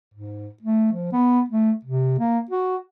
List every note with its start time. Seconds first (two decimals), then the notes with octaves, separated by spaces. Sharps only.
0.14 G#2
0.62 A3
0.93 F3
1.12 B3
1.50 A3
1.85 C3
2.19 A#3
2.51 F#4